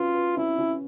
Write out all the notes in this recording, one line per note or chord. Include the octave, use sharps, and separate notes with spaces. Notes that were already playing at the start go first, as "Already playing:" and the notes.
Already playing: C#4 F4 F#4 B4
B4
C#4 E4
C#4